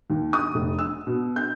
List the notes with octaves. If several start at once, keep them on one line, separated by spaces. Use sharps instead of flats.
D#2
D#6
F1
E6
B2
G6